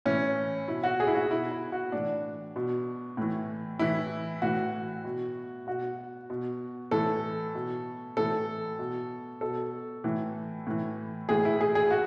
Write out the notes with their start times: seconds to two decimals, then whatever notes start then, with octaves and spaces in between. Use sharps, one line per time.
0.06 A2 E3 C#4
0.68 B2 E4
0.83 F#4
1.00 G#4
1.07 E4
1.15 F#4
1.30 B2 E4
1.51 E4
1.72 F#4
1.92 A2 E3 D4
2.56 B2
3.17 A2 E3
3.79 A2 E3 E4
4.42 A2 E3 F#4
5.05 B2
5.67 B2 F#4
6.30 B2
6.91 A2 E3 A4
7.55 B2
8.17 A2 E3 A4
8.79 B2
9.41 B2 A4
10.04 A2 E3
10.67 A2 E3
11.29 A2 E3 G#4
11.45 E4
11.61 G#4
11.75 G#4
11.91 F#4